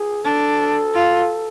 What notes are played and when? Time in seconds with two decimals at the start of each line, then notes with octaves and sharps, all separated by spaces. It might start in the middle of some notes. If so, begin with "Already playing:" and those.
Already playing: G#4
0.24 D4 A4
0.94 F4